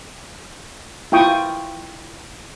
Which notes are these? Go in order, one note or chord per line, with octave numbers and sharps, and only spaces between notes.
E4 F4 G5 C#6 D#6